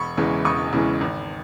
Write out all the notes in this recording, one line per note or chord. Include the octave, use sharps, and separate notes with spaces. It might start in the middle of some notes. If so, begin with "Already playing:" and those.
Already playing: E1 B5 C#6
E2 C#3 E3 G#3
E1 C#6 D#6
E2 C#3 E3 G#3
G#1